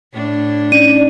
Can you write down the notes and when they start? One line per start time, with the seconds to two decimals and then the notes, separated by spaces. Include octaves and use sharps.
0.14 A2 D4
0.72 C#4 D#4 D5 D#7